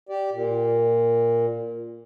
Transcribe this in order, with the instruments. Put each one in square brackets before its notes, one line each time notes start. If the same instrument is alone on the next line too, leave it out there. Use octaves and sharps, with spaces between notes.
[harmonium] G4 D5
A#2